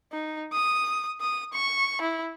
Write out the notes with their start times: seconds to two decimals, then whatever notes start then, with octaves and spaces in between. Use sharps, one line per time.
0.12 D#4
0.53 D#6
1.21 D#6
1.53 C#6
2.01 E4